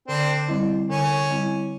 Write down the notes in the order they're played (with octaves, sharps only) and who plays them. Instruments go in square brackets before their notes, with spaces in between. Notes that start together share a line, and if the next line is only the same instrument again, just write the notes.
[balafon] D3 [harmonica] C4 D4
[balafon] G3 C4 E4
[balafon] D3 [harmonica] C#4
[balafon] G3 C4 E4